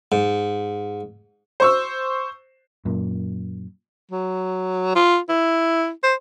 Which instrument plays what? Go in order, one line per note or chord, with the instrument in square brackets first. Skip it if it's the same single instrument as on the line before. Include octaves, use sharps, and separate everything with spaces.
[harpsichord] G#2
[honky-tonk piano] C5 C#6 E6
[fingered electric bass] F#2 A#2
[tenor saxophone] F#3
F4
E4
C5